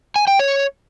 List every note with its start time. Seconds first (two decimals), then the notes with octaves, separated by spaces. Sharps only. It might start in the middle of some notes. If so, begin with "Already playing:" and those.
0.16 G#5
0.28 G5
0.39 C#5